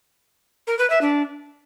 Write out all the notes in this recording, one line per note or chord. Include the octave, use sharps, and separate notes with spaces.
A#4
B4
E5
D4